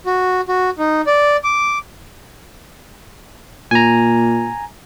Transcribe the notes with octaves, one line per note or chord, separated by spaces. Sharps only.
F#4
F#4
D#4
D5
D6
A#2 G#5 A#5